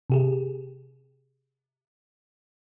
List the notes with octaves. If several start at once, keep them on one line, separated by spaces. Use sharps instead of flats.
C3 G4 G#4